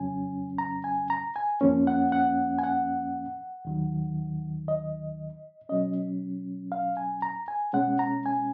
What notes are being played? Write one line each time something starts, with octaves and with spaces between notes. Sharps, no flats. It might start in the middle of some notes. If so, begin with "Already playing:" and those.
Already playing: F2 C#3 F#3 C#4 G#5
A#5
G#5
A#5
G#5
F2 F3 A#3 C#4
F#5
F#5
G#5
F#5
D#2 D#3 F#3
D#5
B2 F#3 C#4 D#5
F5
G#5
A#5
G#5
B2 G#3 C#4 F#5
A#5
G#5